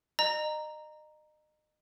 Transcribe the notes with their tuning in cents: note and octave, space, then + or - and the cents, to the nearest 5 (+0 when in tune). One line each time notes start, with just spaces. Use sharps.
D#5 -30 A#5 +0